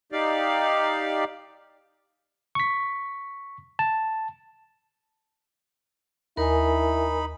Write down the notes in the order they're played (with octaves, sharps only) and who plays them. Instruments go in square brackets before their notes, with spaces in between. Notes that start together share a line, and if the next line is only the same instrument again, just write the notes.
[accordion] D#4 G4 D5 F5
[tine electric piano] C#6 B6
A5
[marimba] D#2 [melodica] D#4 B5 [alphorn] E4 [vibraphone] A#4 G#5